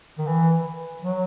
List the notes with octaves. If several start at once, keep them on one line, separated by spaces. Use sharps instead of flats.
D#3
E3
F#3